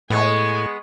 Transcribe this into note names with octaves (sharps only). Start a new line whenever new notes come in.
A2 G#3 B3 G#5 C#6